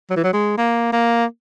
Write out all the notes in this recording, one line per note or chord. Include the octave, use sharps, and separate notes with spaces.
F#3
E3
F#3
G#3
A#3
A#3